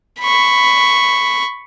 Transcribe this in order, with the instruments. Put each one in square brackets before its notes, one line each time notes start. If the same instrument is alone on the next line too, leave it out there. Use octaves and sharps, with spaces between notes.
[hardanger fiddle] B5 C#6